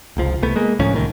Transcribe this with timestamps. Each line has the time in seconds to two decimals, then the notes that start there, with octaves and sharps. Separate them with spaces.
0.17 F1 C#2 F3
0.42 C2 A3 B3
0.56 G#3 A#3
0.79 D2 A2 F3 C#4
0.93 C2 A2 D#3